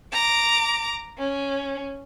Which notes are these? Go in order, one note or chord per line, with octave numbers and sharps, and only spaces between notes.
A#5 D6
C#4